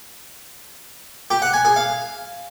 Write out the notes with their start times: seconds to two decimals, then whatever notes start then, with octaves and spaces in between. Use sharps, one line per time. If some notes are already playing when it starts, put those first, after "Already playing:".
1.31 G4
1.42 F#5
1.53 G#5
1.65 G#4
1.76 F5